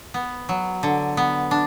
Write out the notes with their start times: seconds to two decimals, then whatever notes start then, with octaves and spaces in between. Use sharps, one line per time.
0.14 B3
0.49 F#3
0.83 D3
1.17 B3
1.51 D4